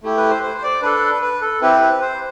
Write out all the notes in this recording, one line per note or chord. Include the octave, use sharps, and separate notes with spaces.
A3 E4 G4
B4
C5
C5
C5
D5
D4 A4 B4
B4
A4
C4 E4 G4 B4
B4
C5